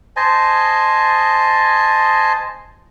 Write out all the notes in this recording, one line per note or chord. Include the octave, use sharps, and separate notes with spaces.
C5 D#5 G#5 A5